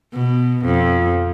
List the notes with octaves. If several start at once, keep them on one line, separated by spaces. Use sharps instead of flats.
B2
F2